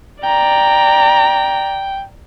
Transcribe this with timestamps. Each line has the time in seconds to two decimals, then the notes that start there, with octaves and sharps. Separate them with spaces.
0.24 D5 G5 A#5